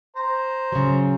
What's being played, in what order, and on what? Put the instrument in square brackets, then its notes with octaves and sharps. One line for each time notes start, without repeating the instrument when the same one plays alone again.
[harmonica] C5 A#5
[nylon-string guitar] C#3 F#3